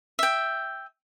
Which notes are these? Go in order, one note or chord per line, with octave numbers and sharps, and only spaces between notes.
E5 G5